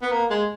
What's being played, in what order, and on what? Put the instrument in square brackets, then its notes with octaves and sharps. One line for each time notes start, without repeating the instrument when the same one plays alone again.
[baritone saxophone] B3
A#3
G#3